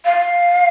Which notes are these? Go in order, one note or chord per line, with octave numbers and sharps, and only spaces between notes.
F5